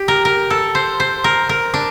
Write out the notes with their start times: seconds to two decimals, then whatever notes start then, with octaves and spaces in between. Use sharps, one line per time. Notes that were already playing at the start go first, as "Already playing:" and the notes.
Already playing: G4
0.08 A#4
0.25 A#4
0.50 A4
0.75 C5
1.00 C5
1.24 A#4
1.49 A#4
1.74 D4